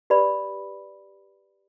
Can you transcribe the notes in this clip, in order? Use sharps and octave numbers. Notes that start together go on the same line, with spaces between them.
G4 B4 D5 B5